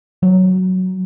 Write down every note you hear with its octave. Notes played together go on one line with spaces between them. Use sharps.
F#3